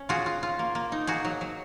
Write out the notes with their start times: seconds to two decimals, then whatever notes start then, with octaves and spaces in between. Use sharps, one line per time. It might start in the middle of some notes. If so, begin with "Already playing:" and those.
Already playing: C#4
0.09 F4 F#4 G#4
0.26 F4
0.43 F4
0.59 A#3
0.75 A#3
0.92 D#4
1.07 A#3 F#4 G#4
1.25 F#3
1.41 F#3